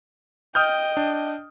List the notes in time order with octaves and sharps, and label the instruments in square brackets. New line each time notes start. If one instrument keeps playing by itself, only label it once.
[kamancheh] D#5 G5 [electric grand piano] D#6 F6 G6
[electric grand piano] D4